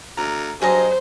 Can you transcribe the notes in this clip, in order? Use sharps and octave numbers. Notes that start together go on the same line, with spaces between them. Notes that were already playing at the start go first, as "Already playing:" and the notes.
D2 A#5
G2 F#3 G#4 C5 D#5 A#5